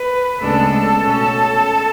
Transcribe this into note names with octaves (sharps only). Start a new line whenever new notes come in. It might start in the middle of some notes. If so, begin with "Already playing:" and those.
Already playing: B4
D2 C#3 G#3 B3 D4 A4
B2 A3 C#4